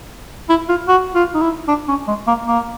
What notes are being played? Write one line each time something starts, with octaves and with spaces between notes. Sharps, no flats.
E4
F4
F#4
F4
D#4
E4
D4
C#4
G#3
A#3
A#3